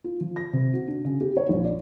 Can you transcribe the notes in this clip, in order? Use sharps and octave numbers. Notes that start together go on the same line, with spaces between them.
F4
F3
A#6
C3
F#4
D4
C#3
G4
C#5
A#1
D5